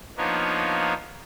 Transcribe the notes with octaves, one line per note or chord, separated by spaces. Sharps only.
F3 A#3 B3 D4 D#4 C#5